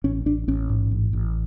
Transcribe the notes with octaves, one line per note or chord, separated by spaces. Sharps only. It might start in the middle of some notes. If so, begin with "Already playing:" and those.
A1 C#4
A1 D4
A1 C#4
G#2
A1
A1